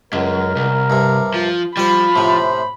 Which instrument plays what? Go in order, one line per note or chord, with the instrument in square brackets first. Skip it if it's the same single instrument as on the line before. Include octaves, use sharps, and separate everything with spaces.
[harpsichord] C#2 [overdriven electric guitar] F#2 [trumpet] A#4
[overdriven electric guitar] C2
[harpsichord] G2 C3
[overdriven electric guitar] F3
[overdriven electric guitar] F3 [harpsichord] G3 C5 [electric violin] B5
[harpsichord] A2 C3 [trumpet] C5